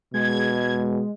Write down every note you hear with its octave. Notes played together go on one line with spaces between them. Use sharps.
B2 G#3 G#6